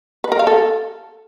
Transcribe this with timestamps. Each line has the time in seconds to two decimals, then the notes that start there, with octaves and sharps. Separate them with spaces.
0.24 B4
0.32 A#4
0.39 F5
0.47 A4